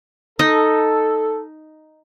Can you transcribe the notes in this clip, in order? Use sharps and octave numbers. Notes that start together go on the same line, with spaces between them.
D#4 A4